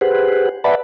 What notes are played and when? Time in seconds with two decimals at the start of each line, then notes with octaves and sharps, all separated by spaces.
0.01 G4 G#4 B4 C5 F#5
0.64 B4 D5 E5 F#5 A5 B5